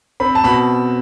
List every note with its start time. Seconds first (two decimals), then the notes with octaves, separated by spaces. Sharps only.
0.20 C4 B5
0.35 A5
0.44 B2 B5